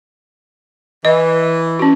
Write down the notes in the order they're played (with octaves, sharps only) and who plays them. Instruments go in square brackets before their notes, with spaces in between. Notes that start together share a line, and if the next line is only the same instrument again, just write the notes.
[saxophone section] E3 [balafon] D#5
[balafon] C#4 F#4